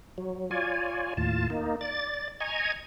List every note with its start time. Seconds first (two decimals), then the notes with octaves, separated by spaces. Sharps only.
0.18 F#3
0.51 F4 C#5 D5 G#5
1.17 D#2 A2 F4 A5
1.50 A#3 D#4
1.81 D5 A6
2.40 D#5 G#5 A#5 C#6 G#6